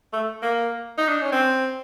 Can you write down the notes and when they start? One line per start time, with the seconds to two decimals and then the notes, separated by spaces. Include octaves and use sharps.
0.13 A3
0.42 A#3
0.98 D#4
1.09 D4
1.21 C#4
1.32 C4